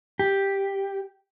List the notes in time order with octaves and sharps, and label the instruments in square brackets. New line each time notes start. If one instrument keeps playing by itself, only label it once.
[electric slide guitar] G4